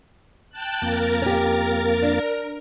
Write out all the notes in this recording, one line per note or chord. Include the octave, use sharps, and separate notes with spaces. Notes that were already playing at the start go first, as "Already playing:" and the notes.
G5 A5 F#6
F2 A#3 A#4 A6
C#4 G4
D4